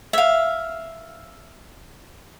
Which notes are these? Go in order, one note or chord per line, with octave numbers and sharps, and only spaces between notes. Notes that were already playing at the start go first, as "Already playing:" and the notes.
E5 F5